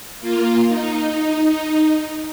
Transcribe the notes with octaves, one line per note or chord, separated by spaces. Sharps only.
A#3 F4
D#4